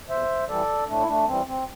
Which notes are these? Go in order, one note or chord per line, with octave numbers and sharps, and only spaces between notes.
E2 C5 E5
E3 G3 A4 D5
A2 A3 D4
E4
A3 D4
E3 G3 C4
C4